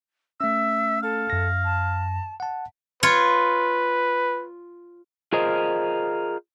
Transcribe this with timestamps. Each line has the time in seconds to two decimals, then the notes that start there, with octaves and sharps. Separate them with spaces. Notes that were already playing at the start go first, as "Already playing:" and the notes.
0.41 A3 C#4 E5 E6
1.03 A4 F5
1.30 F#2 A#6
1.64 A5
2.40 F#5 A5
3.03 F4 B4 C#5
5.33 F4 G#4 A#4 C5 D#5